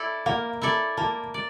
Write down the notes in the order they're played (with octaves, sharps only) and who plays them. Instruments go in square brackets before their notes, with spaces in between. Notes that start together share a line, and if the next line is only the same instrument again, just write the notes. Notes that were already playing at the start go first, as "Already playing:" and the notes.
Already playing: [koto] E4 A4 D5
[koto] A#3 [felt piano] F5
[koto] E4 A4 D5
[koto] A#3 [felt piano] A5
[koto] D5